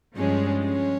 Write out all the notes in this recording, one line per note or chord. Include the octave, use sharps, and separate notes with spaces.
G2 F3 G#3 C#4
C#4